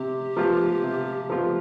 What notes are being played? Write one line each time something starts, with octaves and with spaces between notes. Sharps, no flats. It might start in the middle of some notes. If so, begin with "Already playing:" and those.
Already playing: C3 G4
F3 B3 F4
C3
F3 B3 F4